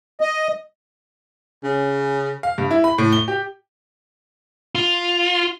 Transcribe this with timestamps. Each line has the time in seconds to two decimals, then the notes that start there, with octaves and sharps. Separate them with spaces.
0.21 D#5
1.64 C#3 C#4
2.43 F5
2.58 G2
2.71 E4
2.84 B5
2.98 A2
3.12 G7
3.28 G4
4.75 F4